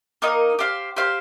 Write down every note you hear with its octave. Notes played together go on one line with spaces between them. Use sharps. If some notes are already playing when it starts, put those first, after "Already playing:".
A#3 D#4 A#4 D#5
G4 C5 F5
G4 C5 F5